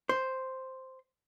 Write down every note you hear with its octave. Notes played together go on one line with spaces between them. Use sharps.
C5